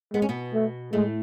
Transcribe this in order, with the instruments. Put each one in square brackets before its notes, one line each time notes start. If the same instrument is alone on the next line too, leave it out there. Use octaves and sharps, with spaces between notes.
[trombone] G#3 [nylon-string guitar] B3
[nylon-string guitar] C#4
B2 B3
[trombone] A3
[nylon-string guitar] A2 A3 [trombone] G#3